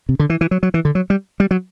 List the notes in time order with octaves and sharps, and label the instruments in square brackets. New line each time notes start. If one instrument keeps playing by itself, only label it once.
[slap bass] C3
D3
E3
E3
F#3
F#3
E3
D3
F#3
G3
G3
F#3